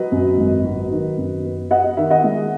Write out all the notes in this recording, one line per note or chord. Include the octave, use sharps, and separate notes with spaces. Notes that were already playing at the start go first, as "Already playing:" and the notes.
Already playing: F#3 B4 D#5
F#2
G#1
F#3
D#3
F#2
B3
B3 D#5 F#5
D#5
D#3 E5
D#5 F#5
G#3